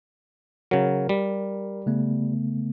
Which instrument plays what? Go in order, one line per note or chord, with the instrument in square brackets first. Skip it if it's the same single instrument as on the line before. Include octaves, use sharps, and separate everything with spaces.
[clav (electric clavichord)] C#3 F#3 [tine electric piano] A#4
[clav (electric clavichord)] G3
[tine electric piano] C#3 A3 B3